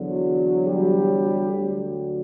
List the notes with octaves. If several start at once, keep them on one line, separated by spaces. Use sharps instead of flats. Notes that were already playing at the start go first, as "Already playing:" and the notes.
Already playing: E2 D3 F#3
G3 G4
D2 D3 F#3